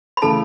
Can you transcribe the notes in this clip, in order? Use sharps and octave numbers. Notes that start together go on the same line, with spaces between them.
B5
C#3 E3 A3 A4 A5